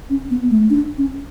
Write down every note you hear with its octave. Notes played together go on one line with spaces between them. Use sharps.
C#4
B3
A3
D4
C#4